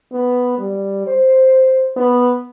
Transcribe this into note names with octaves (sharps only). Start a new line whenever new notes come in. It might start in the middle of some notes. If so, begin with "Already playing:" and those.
B3
G3
C5
B3